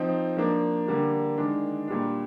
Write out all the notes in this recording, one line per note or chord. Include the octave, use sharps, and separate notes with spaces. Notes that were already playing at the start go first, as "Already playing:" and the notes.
Already playing: F3 C4 D#4
F3 A#3 D4
D3 G3 A#3 D4
D#3 G#3 D4
A#2 G3 D4